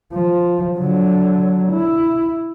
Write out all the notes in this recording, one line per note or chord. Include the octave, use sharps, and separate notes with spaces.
F3
D3 F#3
E4